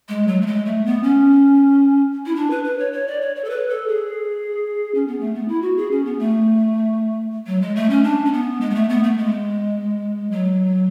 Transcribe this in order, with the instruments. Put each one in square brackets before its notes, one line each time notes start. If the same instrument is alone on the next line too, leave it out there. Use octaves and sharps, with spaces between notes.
[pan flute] G#3
F#3
A3
G#3
A3
B3
C#4
E4
D4
B4
B4
C#5
C#5
D5
C#5
C#5
A4
B4
A4
G#4
C#4
B3
A3
B3
E4
F#4
G#4
C#4
B3
A3
F#3
G#3
A3
C#4
D4
C#4
B3
G#3
B3
A3
B3
A3
G#3
F#3